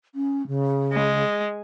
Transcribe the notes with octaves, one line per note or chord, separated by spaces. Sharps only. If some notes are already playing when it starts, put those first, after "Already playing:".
C#4
C#3
G#3